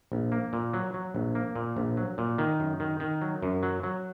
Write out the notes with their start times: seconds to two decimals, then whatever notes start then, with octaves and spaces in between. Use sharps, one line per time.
0.12 A#1
0.32 A#3
0.53 A#2
0.74 F#3
0.94 F#3
1.15 A#1
1.35 A#3
1.56 A#2
1.77 A#1
1.97 F#3
2.18 A#2
2.38 D#3
2.60 F#2
2.80 D#3
3.00 D#3
3.22 F#3
3.42 F#2
3.63 F#3
3.83 F#3